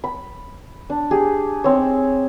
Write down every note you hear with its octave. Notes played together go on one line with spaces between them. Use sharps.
B5
D4
G4 G#4
C4 D#4 C#5